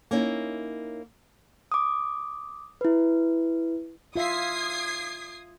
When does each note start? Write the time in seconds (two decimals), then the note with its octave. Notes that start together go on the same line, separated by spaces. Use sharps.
0.11 A#3 C#4 D#4 E4
1.72 D6 D#6
2.81 E4 B4
4.16 F4 E5 D#6 G#6 C7